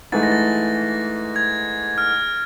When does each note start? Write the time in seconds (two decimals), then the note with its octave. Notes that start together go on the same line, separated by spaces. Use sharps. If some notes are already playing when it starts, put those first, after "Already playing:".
0.12 G#2 E3 A3 A6
0.23 A#6
0.32 A6
1.36 G#6
1.98 F6